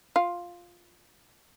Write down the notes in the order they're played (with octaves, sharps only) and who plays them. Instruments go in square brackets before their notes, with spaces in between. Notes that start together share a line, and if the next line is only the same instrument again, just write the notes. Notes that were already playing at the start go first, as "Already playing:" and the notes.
[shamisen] F4